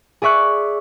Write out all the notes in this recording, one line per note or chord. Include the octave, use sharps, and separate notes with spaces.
G#4 D5 E5 C#6 F#6